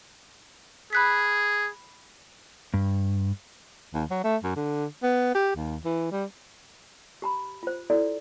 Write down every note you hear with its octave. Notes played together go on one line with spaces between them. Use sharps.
G#4 B5 F#6 B6
G2
D#2
F#3
A3
F#2
D3
B3
G4
D#2
E3
G3
G4 A#5 B5
F4 C5
E4 F#4 A4 D5